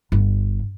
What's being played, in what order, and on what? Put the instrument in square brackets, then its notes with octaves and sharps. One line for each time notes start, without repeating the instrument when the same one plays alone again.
[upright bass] G1